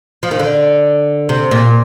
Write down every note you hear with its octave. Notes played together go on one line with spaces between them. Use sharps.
F3
D#3
D3
C3
A#2